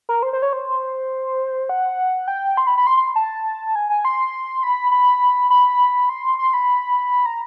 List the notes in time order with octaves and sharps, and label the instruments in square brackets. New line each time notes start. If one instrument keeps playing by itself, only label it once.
[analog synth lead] A#4
C5
C5
C#5
C5
F#5
G5
C6
B5
B5
C6
C6
A5
G#5
G#5
C6
B5
B5
B5
C6
C6
B5
A#5